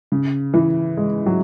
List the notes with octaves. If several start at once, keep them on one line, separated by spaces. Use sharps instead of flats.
C#3
E3
G#3
F#3